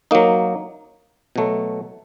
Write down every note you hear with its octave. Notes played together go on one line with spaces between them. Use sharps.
F#3 A#3 D#4
B2 F#3 A3